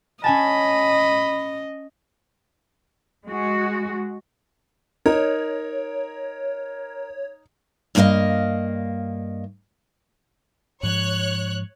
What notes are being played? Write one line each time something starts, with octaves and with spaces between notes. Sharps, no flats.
C#4 D#5 G#5 A5 B5
G#3 F#4
D#4 A#4 C#5
G2 A#3 F4 A#4 D#5 F5
G#2 F3 C#5 F#6